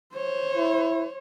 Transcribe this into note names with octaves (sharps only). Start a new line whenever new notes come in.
C5 C#5
E4